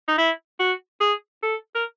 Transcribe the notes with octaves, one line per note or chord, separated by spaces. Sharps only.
D#4
E4
F#4
G#4
A4
A#4